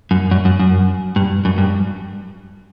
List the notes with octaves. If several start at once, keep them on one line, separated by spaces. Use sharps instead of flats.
F#2
F#2
F#2
F#2
G2
F#2
G2